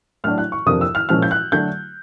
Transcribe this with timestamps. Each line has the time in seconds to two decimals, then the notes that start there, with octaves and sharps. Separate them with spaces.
0.24 A2 F#3 A3 D4 F6
0.38 F#6
0.52 C#6
0.66 F2 C3 F3 A#3 D4 D#6
0.81 E6
0.95 F6
1.09 A#2 F3 G#3 C#4 F6
1.22 G6
1.31 F#6
1.52 D3 F#3 A3 D4 G6